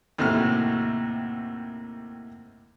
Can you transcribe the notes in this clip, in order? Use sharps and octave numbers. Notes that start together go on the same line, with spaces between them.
D#2 A2 C3 F#4 F6